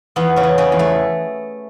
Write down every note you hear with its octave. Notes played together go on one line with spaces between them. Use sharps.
E2 B3
C#3 C#4
E3
C#3 C#4
E2
A3